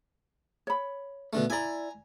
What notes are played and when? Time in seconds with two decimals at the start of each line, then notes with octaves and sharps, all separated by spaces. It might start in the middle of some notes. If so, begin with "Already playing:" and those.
0.67 C#5 B5
1.33 B2 D3 A3
1.50 E4 D5 G#5 A#5